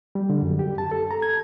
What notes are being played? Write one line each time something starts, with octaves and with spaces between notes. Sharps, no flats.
G3
D3
F#2
G4
A5
A4
A#5
G#6